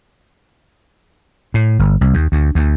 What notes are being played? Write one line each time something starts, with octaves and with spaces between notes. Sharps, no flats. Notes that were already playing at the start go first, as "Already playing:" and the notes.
A2
G1
C2
D#2
D2
D2